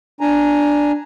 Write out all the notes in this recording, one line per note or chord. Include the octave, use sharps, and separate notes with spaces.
D4 G#5 A#5